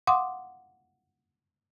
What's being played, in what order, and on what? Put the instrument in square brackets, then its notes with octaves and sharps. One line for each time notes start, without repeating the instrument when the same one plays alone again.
[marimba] F5 F#5 C6 D6 D#6